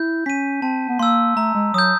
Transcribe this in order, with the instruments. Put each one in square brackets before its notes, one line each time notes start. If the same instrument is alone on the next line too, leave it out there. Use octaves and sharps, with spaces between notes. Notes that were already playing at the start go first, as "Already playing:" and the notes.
Already playing: [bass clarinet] E4 [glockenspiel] G6
[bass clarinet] C#4 [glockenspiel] B6 D#7
[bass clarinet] C4 [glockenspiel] A5
[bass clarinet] B3
[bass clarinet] A#3 [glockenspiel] C6 E6
[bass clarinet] A3 [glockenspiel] A#5
[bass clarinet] G#3
[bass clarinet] F#3 [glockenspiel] D#6 G6